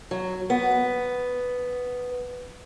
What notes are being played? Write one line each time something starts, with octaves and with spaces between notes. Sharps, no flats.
F#3
B3